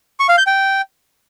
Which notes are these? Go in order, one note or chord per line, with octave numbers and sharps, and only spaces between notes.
C#6
F5
G6
G5